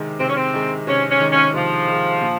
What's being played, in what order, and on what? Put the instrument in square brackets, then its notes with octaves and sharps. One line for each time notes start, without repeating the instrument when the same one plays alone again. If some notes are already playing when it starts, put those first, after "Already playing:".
Already playing: [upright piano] C3 D#3 G#3
[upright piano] C3 [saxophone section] C4
[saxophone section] C#4
C4
[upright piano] D#3 G#3
[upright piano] C3 [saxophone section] C#4
[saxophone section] C#4
[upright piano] D#3 G#3
[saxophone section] C#4
[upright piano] C3 [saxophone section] F3
[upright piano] D#3 G#3
A#2